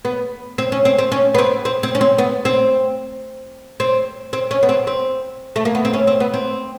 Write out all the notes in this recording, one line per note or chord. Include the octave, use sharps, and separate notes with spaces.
B3
C4
C#4
C4
C4
C#4
B3
C4
C4
C4
C#4
C4
B3
C4
C4
C4
C#4
B3
C4
C4
A3
A#3
B3
C4
C#4
C4
B3
C4